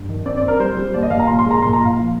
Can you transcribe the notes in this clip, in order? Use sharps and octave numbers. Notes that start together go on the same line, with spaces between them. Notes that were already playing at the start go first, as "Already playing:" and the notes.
Already playing: G2
D#3
C4 D5
D5
C4
A#4
G3 C5
G3
D#2 D5
D#5
D#2 F5
A#5
A#2 C6
C6
G#3
A#5
A#2 C6
A#5
A#2
F5
F3